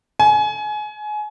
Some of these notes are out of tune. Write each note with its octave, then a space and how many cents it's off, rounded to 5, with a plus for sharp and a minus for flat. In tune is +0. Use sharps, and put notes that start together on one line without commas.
G#5 +25